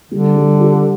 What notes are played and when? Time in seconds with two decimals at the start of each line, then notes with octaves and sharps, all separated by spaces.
0.12 D3 G3
0.36 G3
0.60 G4